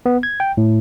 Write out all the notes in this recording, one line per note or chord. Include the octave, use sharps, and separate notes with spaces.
B3
G#6
G5
A2